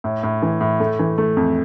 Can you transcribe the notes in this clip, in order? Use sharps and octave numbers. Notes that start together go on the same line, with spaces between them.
A2
A2
E3
A2
A3
E3
A3
F2